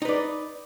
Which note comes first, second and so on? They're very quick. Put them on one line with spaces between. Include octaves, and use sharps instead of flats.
D#4 B4 D5